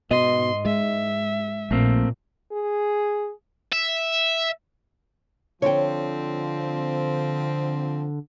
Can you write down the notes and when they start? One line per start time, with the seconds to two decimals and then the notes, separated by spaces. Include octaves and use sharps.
0.11 G#2 B2 D#5 C6
0.65 G#3 E5
1.71 A#1 A#2 A3 A#3 C4
2.51 G#4
3.73 E5
5.62 D3 F3 C4 C#5 G5